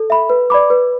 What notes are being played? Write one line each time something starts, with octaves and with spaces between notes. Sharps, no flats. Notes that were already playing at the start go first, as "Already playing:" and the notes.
Already playing: A4
E5 B5
B4
D5 B5 D6
B4